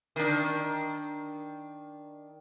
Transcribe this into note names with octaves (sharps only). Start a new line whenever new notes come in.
D#3 D4